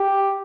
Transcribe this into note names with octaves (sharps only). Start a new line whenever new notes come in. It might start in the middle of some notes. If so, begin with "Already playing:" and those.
Already playing: G4